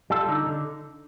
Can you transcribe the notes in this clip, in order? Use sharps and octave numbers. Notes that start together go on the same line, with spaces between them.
G3 F4 A4
D3 D#4
D3